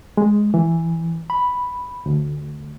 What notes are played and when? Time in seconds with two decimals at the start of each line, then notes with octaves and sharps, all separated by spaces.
0.17 G#3
0.54 E3
1.30 B5
2.06 D2